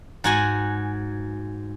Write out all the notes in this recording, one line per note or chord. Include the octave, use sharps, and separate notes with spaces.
G#2 F#4 G#5